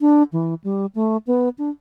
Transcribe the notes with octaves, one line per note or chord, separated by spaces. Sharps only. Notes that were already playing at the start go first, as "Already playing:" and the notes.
D4
E3
G3
A3
B3
D4